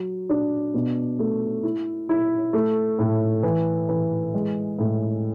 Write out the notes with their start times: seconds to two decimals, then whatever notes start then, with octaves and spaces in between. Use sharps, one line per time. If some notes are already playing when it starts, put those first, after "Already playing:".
Already playing: F#3
0.29 D4
0.74 B2
1.19 A3
1.63 E4
2.09 E4
2.53 A3
2.99 A2
3.43 E3
3.89 E3
4.34 G#3
4.79 A2